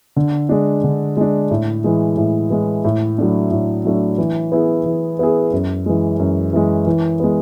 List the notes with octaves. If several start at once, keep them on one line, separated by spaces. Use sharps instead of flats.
D3
G#3 D4
D3
G#3 D4
A2
E3 G#3
A2
E3 G#3
A2
F#3 A3 D4
A2
F#3 A3 D4
E3
B3 E4 G#4
E3
B3 E4 G#4
F#2
E3 G#3
F#2
E3 G#3
E3
G#3 B3